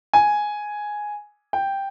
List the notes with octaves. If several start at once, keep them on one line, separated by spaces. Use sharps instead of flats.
G#5
G5